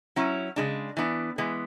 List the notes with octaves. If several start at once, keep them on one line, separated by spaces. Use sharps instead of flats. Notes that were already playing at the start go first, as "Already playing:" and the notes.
F#3 C#4 E4
C#3 G#3 D4
E3 B3 D4
E3 G#3 B3